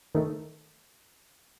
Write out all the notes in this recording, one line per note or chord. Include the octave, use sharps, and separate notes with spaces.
D#3 A3